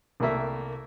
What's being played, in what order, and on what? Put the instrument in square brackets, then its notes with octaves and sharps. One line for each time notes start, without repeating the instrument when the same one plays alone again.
[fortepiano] C2 A3 A#3 E5